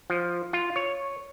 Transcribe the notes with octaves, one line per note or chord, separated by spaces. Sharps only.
F3
F4
C#5